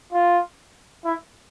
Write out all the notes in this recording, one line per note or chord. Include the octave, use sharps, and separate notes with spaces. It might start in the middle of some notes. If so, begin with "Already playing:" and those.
F4
E4